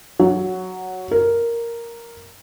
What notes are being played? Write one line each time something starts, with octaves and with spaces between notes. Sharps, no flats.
F#3
A#4